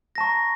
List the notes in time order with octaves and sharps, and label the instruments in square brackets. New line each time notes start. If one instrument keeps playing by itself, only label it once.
[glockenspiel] A#6
A5
C#6
A#5